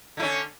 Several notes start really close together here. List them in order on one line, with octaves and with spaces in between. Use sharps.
D3 E4 C#4